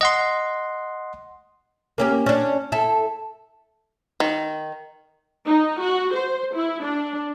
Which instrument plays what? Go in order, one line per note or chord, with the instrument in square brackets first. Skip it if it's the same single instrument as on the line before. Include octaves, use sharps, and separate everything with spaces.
[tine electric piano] D#5 F#5 C6
[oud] A#3 C#4 G4
C#4 D4
E4 A4
[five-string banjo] D#3
[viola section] D#4
F#4
C5
E4
D4